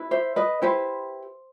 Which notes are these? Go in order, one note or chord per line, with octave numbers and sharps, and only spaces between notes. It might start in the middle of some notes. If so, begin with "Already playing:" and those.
Already playing: E4 B4
C5 E5
B4 D#5
E4 G4 B4 C5